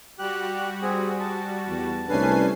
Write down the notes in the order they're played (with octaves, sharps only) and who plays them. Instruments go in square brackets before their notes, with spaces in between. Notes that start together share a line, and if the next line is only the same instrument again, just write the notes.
[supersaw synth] G3 F#4 [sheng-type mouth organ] G4 F#6
[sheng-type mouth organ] C4 G#4
A5
[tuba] E2
[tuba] C2 [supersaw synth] A3 G#5 C7 [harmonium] C#4 D4 B4